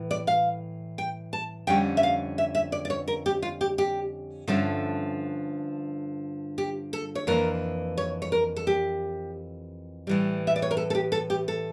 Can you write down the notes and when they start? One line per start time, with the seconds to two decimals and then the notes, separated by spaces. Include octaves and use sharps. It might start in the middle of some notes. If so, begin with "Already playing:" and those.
Already playing: A2 E3
0.11 D5
0.27 F5
0.98 G5
1.33 A5
1.67 F2 D3 G3 C#4 G5
1.97 E5
2.03 F5
2.38 E5
2.55 E5
2.72 D5
2.85 D5
2.90 C#5
3.08 A#4
3.26 G4
3.42 F4
3.61 G4
3.78 G4
4.47 G2 D3 F3 A3 C#4 A4
6.58 G4
6.93 A4
7.15 C#5
7.27 F2 E3 A#3 D4 A#4
7.98 C#5
8.22 C#5
8.32 A#4
8.56 A4
8.67 G4
10.07 A2 E3 G3
10.47 E5
10.56 D5
10.62 C#5
10.71 A#4
10.77 A4
10.90 A4
10.95 G4
11.12 A4
11.30 G4
11.48 A4